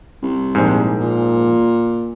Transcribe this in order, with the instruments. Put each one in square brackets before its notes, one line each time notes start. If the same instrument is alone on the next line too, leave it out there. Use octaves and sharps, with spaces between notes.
[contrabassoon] C2
[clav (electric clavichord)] A#1 G#2
[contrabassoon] A#2